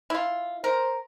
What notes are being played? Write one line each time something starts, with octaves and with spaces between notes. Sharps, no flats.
E4 F4
A#4 C5